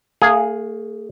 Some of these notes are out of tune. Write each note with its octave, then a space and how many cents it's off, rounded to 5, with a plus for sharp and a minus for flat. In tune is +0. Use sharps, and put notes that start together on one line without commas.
A3 +45 G#4 +0 F5 +25